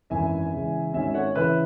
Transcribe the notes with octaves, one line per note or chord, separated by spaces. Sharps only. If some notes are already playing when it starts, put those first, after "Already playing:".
G#1 F#2 E3 E5 G#5
E2 C#3 G#3
G#1 G#2 F#3 C#4 E5 G#5
C#5 F#5
E2 C#3 E3 C#4 E4 B4 E5